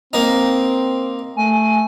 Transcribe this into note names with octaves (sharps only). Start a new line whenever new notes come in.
A#3 C4 D#4
A3 G#5